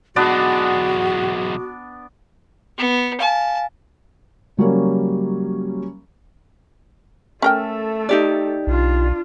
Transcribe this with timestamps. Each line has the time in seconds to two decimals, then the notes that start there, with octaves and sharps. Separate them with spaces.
0.16 B1 G#3 B3 D4 F#4 D5
2.78 B3
3.20 F5 G#5 A5
4.57 C#3 F#3 G3 A#3 C#4
7.42 A3 C#4 A4 A#4 G5
8.09 D#4 G4 D5
8.67 B1 D4 F4